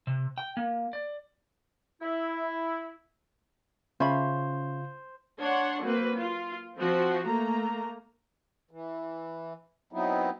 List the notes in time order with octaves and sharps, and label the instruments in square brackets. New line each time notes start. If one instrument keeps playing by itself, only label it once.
[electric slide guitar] C3
G5
A#3
D5
[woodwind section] E4
[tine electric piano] C#3 F4 [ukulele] C#4 E5 B5 [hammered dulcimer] C5
[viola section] D4 C#5 F#5 C6
F#3 A#3 C4 B4
F4
F3 C4 F#4
A3 A#3 A#5
[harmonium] E3
F#3 B3 C4 D#4 E4